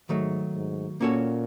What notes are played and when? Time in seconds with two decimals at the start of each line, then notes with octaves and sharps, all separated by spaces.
0.09 G#2 D#3 F#3 A3
0.54 G#2
1.01 A#2 A#3 C#4 F#4 A4 C#5